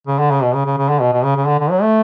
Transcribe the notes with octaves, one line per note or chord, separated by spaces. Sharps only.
C#3
D3
C#3
B2
C#3
C#3
C#3
D3
B2
B2
C#3
C#3
D3
D3
F#3
A3